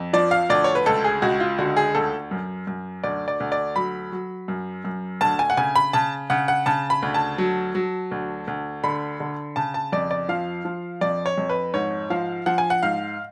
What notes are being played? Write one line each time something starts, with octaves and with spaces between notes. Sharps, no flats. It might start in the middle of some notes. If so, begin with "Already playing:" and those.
Already playing: F2
F3 D5
F5
D2 D5
C#5
B4
C#2 A4
G#4
C#2 F#4
F4
D3 F#4
G#4
D2 A4
F#2
F#2
D2 D5
D5
D2
D5
F#3 B5
F#3
F#2
F#2
D2 A5
G#5
F#5
C#3 G#5
B5
C#3 A5
C#3 F#5
F#5
C#3 A5
B5
D2
A5
F#3
F#3
D2
D2
D3 B5
D3
C#3 A5
A5
F2 D5
D5
F3 F5
F3
F2 D5
C#5
F2
B4
G#2 C#5
F3 F5
F3 F#5
G#5
F#5
G#2 F5